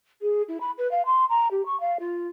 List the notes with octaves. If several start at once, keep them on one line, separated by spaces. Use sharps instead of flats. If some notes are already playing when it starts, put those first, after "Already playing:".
G#4
E4
B5
B4
F5
C6
A#5
G4
C#6
F5
F4